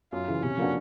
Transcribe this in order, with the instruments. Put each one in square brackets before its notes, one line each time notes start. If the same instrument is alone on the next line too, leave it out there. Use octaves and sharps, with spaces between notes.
[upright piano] F#2 [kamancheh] F4
[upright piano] C#3 E3
[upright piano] C3 [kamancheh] C#4
[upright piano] F3 A#3 D4 F#4